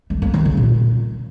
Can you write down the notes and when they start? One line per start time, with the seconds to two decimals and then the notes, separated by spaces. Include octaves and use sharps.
0.10 A3
0.22 A#3
0.34 D#3
0.45 C#3
0.57 A#2